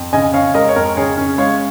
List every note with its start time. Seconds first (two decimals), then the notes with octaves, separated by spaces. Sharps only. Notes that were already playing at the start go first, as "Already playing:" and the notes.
Already playing: F2
0.13 C#3 D#5 G#5
0.33 C#4 C#5 F5
0.54 G#3 A#4 D#5
0.69 C#5
0.76 F2 A#4
0.97 C#3 G#4 C#5
1.17 C#4
1.38 G#3 C#5 F5